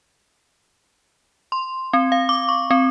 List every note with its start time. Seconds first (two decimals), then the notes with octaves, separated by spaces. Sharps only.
1.52 C6
1.93 C4
2.12 F5
2.29 D6
2.49 C#6
2.71 C4